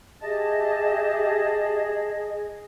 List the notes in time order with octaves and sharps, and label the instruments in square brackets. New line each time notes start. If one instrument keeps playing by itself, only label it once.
[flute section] G4 E5 [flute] G#4 [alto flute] D#5 [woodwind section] A5